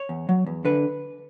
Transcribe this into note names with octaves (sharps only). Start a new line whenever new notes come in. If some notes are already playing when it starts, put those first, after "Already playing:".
Already playing: C#5
E2
F#3
E2
D3 B4